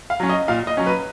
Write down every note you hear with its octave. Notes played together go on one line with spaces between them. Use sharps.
F5
F#3 C#4
D#5
A#2 F5
D#5
F#3 C#4
B4